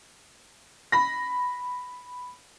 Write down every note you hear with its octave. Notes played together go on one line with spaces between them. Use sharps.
B5 A#6